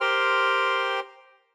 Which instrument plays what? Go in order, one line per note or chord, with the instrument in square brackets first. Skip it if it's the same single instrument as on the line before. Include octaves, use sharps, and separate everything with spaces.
[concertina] G4 A#4 C5 G5 C6 F6